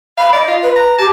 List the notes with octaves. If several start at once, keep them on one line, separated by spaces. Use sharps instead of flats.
F5 B5
D5 D#5
F4
B4
A#5
G4 A5